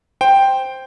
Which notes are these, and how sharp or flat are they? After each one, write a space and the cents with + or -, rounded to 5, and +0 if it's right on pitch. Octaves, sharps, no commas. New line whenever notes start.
C5 +0 G5 +0